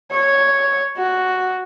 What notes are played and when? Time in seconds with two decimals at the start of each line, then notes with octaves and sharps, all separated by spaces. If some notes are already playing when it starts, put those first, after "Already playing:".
0.11 C#5
0.97 F#4